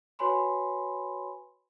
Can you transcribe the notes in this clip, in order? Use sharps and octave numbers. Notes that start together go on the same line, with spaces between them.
F#4 B4 C#5 G#5 B5 C6